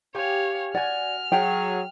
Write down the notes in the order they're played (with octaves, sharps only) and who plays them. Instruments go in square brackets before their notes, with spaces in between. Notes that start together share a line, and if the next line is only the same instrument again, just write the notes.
[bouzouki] G4 G#5 [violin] C#5 F5
[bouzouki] F#4 G#5 [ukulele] D5 [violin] F6
[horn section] F#3 G#4 [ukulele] G5